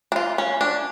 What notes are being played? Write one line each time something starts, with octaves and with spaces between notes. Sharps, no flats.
D4
F4
C#4
D4